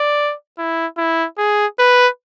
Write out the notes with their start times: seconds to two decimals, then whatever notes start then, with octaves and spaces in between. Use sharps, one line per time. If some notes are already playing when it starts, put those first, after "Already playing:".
Already playing: D5
0.58 E4
0.98 E4
1.38 G#4
1.79 B4